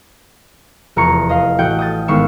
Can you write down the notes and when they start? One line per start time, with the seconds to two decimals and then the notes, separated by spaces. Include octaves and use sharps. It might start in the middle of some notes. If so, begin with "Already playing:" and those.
0.96 F1 E2 A#5 C#6 C#7
1.29 D#5 F5
1.59 A1 F#4 F#5 G5 G6
1.79 D#6 G6 A6
2.08 G#1 B3 D#4 F5 C#6 E6